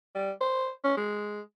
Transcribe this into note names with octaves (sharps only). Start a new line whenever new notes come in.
G3
C5
C#4
G#3